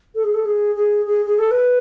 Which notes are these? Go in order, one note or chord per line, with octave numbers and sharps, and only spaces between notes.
A4
G#4
A4
G#4
G#4
G#4
G#4
A4
B4